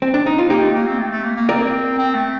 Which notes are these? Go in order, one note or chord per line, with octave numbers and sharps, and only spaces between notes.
C4
D4
D#4
F4
A#3 D#4 G4
A3
A#3
C4
A3
A3
A#3
A#3
C4 A#4 D5
C4
A3